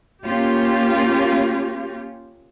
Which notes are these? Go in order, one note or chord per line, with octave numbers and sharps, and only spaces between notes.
A#3 C#4 F4 G4